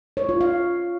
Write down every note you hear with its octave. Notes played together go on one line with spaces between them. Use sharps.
C#5
F4
F5